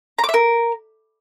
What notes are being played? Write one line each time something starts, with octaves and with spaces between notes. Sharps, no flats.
A#5
D6
E5
A#4